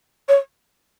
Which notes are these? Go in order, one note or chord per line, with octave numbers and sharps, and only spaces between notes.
C#5